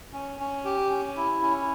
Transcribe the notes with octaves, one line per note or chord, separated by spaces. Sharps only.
C#4
C#4
G4
C#4
E4
C#4